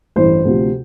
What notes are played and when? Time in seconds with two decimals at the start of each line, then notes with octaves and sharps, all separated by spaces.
0.16 A1 G2 E3 A3 C5
0.45 D2 C3 F3